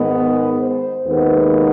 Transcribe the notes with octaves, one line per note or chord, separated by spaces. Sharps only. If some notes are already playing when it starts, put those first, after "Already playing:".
Already playing: G#2 D#3 G#3 B3
C5
D#2 D#3 G#3 B3